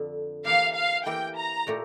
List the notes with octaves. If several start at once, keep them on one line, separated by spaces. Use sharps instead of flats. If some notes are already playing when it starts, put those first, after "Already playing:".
Already playing: F2 D3 F3
E3 A#3 E4 G4 A#4 F5
F5
E3 A#3 E4 G4 A#4 G5
A#5
A#2 A3 E4 G4